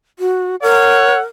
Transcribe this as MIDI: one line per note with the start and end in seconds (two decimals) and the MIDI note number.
0.19 0.56 66
0.62 1.23 70
0.62 1.18 73
0.62 1.18 78